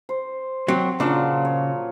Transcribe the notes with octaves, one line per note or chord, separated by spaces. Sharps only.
C5
F#3 C4
A#2 C#3 F3 F#3 D4
C#5